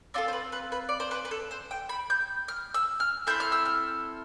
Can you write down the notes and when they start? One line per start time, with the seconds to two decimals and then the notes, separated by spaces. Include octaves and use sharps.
0.14 C4 F4 A4 D5
0.28 C5
0.33 B4
0.52 B4
0.72 B4
0.89 D5
1.00 C5
1.11 B4
1.25 B4
1.31 A4
1.51 C5
1.71 G5
1.89 B5
2.10 G6
2.48 F6
2.74 E6
3.00 F6
3.27 C4 E4 A4 G6
3.40 F6
3.52 E6
3.65 F6